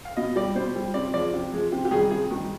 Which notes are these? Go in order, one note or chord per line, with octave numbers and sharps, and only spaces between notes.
F5
B2 D#5
G3 D5
B2 C5
G3
C3 D5
F3 G#3 D5
C3
F3 G#3
C3 G4
G4
D#3 G3 G#4
C3 G#4
D#3 G3